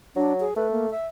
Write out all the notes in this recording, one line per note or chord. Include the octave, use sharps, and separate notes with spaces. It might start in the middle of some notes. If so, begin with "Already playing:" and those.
F#3 D4
G#4
A3 B4
A#3
E5